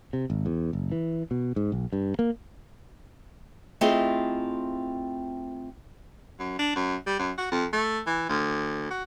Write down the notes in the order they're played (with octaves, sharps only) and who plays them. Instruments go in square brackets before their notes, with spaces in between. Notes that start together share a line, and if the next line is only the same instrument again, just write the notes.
[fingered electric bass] C3
G#1
E2
F#1
E3
B2
G#2
B1
G2
A#3
[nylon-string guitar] A3 C4 E4 F4 G#4 D#5
[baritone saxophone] F#2
D4
F#2
G3
F#2
F#4
F2
A3
E3
D2
F#4